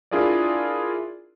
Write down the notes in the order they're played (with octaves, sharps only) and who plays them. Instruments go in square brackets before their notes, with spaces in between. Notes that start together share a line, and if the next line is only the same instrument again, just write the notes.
[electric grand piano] D4 E4 F4 G#4 A#4 D5